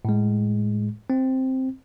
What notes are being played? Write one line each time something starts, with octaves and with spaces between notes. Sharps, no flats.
A2 G#3
C4